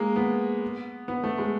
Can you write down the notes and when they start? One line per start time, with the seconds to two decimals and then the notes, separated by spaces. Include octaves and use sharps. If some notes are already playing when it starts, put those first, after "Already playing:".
Already playing: G#3 A#3
0.16 B3
1.08 B3
1.23 A3
1.38 G#3